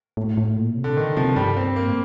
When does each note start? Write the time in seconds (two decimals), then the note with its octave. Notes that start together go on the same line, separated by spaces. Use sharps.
0.17 A2
0.37 A2
0.57 A#2
0.77 C3
0.84 D3
0.96 D3 D#3
1.17 C3 F3
1.36 G2 G3
1.57 C4
1.76 A#3
1.87 A2